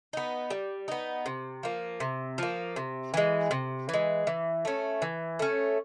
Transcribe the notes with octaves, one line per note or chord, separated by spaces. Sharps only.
B3 D#4
G3
B3 D#4
C3
F3 A#3
C3
F3 A#3
C3
E3 G#3
C3
E3 G#3
E3
A3 C#4
E3
A3 C#4